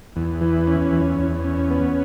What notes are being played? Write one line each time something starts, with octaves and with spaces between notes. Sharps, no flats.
E2
E3
C#4
E2
E2
C#4
B3